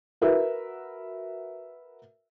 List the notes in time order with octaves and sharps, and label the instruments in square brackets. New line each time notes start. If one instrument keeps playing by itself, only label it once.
[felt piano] F#4 A#4 B4 E5